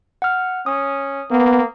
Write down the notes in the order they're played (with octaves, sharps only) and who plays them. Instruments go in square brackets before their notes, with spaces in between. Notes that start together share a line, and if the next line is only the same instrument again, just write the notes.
[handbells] F#5 F6
[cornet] C#4 [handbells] D#6
[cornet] A#3 [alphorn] B3